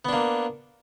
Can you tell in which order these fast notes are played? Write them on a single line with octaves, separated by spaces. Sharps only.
B3 D4 A#3